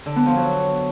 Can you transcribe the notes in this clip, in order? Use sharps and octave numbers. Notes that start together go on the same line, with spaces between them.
D3
B3
F3
F#3